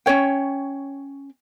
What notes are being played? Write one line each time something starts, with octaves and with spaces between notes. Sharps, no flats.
C#4 F4 C#5 G5